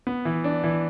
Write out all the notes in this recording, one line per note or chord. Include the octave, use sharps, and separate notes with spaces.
B3
E3
D4
E3